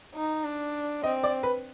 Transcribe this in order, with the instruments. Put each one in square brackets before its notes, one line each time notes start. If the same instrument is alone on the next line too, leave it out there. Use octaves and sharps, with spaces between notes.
[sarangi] D#4
D4
[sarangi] C4 [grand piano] D#5
[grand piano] D5
B4